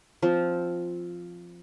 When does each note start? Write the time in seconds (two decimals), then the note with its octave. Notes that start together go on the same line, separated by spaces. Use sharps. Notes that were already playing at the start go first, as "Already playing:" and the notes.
0.22 F3 C4